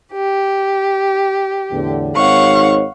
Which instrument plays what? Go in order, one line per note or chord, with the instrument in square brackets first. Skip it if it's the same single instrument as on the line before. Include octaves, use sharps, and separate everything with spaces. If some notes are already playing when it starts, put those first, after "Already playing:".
[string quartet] G4
[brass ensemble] E2 A2 D3
[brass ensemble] G#1 D#4 C#5 [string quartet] F5 F#5 C#6